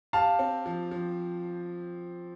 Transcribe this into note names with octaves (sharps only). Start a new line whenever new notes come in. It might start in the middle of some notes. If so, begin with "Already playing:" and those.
G4 F5 A5
C4
F3
F3